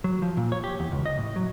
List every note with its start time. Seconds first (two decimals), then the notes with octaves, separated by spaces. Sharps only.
0.04 F#3
0.22 F3
0.37 A#2
0.52 C#5
0.64 G4
0.80 E2
0.92 C#2
1.06 D#5
1.18 A2
1.36 F#3